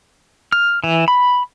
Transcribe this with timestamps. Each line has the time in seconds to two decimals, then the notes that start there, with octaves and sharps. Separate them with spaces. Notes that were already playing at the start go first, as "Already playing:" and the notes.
0.52 F6
0.84 E3
1.08 B5